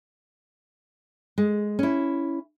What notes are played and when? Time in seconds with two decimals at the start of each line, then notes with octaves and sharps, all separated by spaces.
1.38 G#3
1.79 C#4 E4